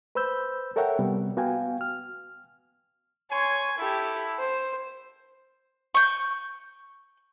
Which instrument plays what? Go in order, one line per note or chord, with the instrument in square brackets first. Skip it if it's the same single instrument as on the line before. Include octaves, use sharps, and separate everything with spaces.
[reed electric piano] B4 C5 B5 E6 G6
A4 A#4 C#5 E5 F#5 G5
C3 G3 B3
B3 F#4 F5 G5 G#5
F6
[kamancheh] C#5 C6 [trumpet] G#5
[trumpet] E4 [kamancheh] G4 A4
[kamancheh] C5
[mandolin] C#6 G6